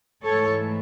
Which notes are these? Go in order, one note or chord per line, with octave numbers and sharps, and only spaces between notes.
G#2 E3 A3 A4 C#5